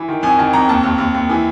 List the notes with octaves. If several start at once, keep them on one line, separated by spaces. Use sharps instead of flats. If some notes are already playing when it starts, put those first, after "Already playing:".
Already playing: E3
D#3
F2 G#5
D#3 A5
F2 A#5
D#2 A5
D#2
D#2
D#2
E3